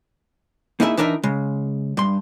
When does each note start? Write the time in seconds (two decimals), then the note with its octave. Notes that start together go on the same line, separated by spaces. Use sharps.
0.80 A#3 D#4 E4 G#4 D#5 E5
0.97 E3 D4 D#4 A#4 C5 E5
1.23 C#3 G#3
1.97 G2 C6